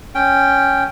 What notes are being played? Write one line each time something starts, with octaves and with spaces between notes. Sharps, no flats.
C#4 G5